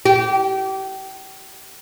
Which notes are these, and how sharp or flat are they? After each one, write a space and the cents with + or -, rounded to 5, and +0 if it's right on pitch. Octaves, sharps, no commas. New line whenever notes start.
G4 -30